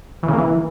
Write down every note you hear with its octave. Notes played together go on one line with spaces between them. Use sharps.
E3
C#3
A#3
E3